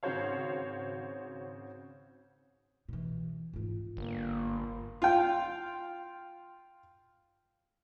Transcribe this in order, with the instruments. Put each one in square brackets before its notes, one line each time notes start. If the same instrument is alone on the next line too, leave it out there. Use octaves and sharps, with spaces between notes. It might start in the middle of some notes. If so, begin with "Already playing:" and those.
[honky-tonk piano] G#1 C#3 F#4 C5 C#5 F5
[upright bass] B2 E3
G#2 F4
[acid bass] G1 [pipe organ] A#3
[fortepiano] F4 G5